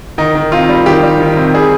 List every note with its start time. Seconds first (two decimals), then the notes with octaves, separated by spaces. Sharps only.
0.18 D#3 D#4
0.35 D#3
0.52 C3 F4
0.69 G3
0.86 D#3 G4
1.03 G3
1.20 D#3
1.37 C3
1.54 G3 G#4